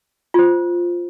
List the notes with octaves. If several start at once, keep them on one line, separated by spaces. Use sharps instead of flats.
F4 C5